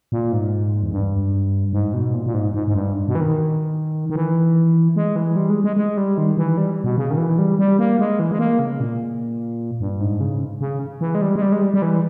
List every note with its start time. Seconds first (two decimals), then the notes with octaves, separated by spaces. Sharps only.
0.12 A#2
0.32 G#2
0.83 E2
0.92 G2
1.73 G#2
1.94 B2
2.14 A#2
2.26 A#2
2.34 G#2
2.54 G#2
2.68 G#2
2.75 G2
3.08 B2
3.15 E3
3.21 D#3
4.10 D#3
4.16 E3
4.96 G#3
5.16 E3
5.36 G3
5.50 G#3
5.64 G#3
5.77 G#3
5.97 G3
6.18 D#3
6.38 E3
6.58 G3
6.84 B2
6.97 C#3
7.11 D#3
7.18 E3
7.39 G3
7.59 G3
7.79 A#3
7.99 G#3
8.20 E3
8.32 G#3
8.39 A#3
8.59 C#3
8.80 A#2
9.80 G2
10.01 G#2
10.21 C#3
10.61 C#3
11.01 E3
11.15 G#3
11.22 G3
11.35 G#3
11.42 G3
11.52 G#3
11.62 G3
11.74 G3
11.82 E3